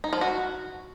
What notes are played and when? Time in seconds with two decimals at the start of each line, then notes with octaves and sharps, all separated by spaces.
0.04 D#4
0.13 F3
0.21 F#4